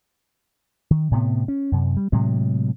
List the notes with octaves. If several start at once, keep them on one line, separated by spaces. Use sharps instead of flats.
D#3
A2 C3 B3
C#4
F#2 C3
G3
A2 C3 F#3 G#3